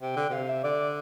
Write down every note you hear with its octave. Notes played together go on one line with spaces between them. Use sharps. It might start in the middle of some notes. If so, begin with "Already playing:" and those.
C3 G5
D3
C3 F5
E5
D3 D5